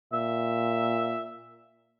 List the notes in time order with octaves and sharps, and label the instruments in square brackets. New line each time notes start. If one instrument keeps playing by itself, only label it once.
[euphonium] A#2 [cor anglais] E5